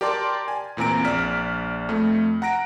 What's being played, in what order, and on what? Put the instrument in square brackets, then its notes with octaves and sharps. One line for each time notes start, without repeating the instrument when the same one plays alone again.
[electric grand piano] G4 A#4 D5 A5 C6 D6
G#5
E2 A#2 C4 A#5 D7
A#1 D5 F6 B6
F2 A3
F#5 A#5 A#6 D7